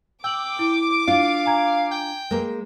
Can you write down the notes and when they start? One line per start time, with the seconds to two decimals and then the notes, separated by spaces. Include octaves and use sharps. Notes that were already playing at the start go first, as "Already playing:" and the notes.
0.24 G5 D6 E6 F#7
0.59 E4
1.08 D4 F4 F5
1.46 G#5 A#5 G#6
1.91 G5
2.31 G#3 A#3 A#4 B4